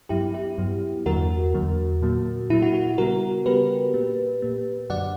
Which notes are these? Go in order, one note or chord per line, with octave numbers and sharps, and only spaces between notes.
G2 F#3 B3 E4 G4
E4 G4
G2 F#3 B3
E2 D3 F#3 A#3 F#4 A#4
E2 D3 F#3 A#3
A#2 F#3 A#3
A#2 F#3 A#3 E4
F#4
F#4
C#3 G3 B3 F#4 A#4
C#3 G3 B3 G4 B4
A#2 A#3
A#2 A#3
F#2 D3 F#3 D5 F#5